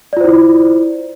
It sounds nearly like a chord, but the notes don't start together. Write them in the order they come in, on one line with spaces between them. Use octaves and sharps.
D5 F4 C5 E4